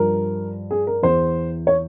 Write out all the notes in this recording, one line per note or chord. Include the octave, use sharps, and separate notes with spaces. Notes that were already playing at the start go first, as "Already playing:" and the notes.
Already playing: G2 F3 A#4
G#4
A#4
E2 E3 C5
C#5